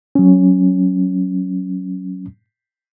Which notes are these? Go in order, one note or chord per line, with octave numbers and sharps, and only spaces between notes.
F#3 C#4